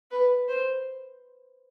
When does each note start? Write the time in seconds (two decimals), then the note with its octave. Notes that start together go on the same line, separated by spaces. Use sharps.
0.11 B4
0.48 C5